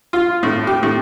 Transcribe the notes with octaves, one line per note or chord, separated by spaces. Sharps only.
F4
A2
G4
A2